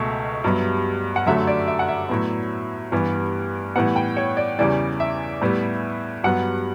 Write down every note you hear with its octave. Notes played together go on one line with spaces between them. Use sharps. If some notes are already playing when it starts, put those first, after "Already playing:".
Already playing: C#2 B2 A3 E5
G2 F#3 B3
F#5
F#2 D3 F#3 A3 E5
D5
E5
F#5
E5
A2 F#3 B3
G2 E3 G3 B3
A2 E3 G3 B3 F#5
G5
C#5
D5
E2 C#3 E3 G3 D5
E5
A2 G3 B3
G2 F#3 B3 F#5